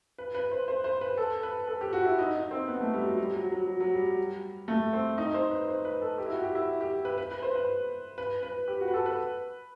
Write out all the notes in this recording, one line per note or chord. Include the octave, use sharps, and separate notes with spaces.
B4
B4
C5
C5
C5
B4
A4
B4
A4
G4
F#4
E4
D#4
D#4
C4
B3
A3
G3
F#3
G3
F#3
F#3
F#3
F#3
G3
G3
A3
C4
D#4
C5
B4
C5
B4
A4
G4
E4
F#4
G4
E4
G4
B4
B4
B4
C5
B4
B4
B4
G4
F#4
B4
A4
B4